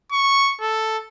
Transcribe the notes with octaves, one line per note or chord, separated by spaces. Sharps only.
C#6
A4